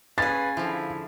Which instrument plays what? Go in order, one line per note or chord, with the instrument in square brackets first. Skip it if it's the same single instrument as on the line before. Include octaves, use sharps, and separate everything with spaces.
[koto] C#4 G#4 [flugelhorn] B4 [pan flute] F5 [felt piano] A6
[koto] D3 F3 [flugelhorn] E4